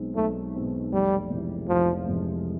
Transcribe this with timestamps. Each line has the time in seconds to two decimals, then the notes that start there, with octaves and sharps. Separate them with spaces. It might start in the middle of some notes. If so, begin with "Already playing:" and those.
Already playing: B1 B2 G#3 C4 D#4
0.16 B1 A3
0.54 B2 G#3 C4 D#4
0.93 F1 G3
1.30 F2 C3 E3 G#3
1.68 F1 F3
2.07 F2 C3 E3 G#3